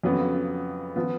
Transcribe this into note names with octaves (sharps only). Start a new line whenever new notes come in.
F2 C#3 F#3 B3
F3 B3